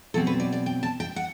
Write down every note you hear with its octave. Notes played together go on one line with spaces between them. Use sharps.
B2 F#3 C4 A4
B4
D5
D5
G5
A5
G5
F#5